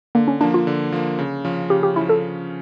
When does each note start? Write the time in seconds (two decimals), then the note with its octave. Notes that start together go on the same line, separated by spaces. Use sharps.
0.15 D3 A#3
0.28 C#4
0.41 F3 A#3 D4
0.54 F4
0.67 D3
0.93 F3 A#3
1.19 C#3
1.45 F3 C#4
1.70 C#3 G4
1.83 G4
1.96 F3 C#4 E4
2.09 A4